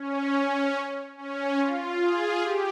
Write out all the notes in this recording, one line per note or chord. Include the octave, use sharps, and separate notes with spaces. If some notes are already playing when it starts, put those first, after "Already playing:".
Already playing: C#4
C#4
C#4
F4
G#4
G4